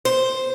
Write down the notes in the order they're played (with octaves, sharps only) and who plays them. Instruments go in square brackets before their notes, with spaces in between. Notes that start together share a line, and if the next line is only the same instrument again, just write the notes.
[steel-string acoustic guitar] C5